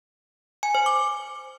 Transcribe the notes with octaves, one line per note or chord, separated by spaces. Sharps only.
G#5
C5
D6